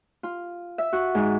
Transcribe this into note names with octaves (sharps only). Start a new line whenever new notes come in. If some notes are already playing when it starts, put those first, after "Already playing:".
F4
E5
F#4
G#2